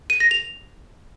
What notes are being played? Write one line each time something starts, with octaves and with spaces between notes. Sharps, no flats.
D#7
A#6
F7